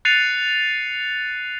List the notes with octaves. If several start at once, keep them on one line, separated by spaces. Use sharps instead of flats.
F#6 A6 C7 C#7 D#7 F7